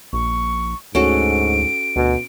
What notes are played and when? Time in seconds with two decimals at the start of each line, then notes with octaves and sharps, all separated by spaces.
0.13 A#1 C#6
0.95 D2 G#2 C#4 F#4 A4 D7
1.96 D2 B2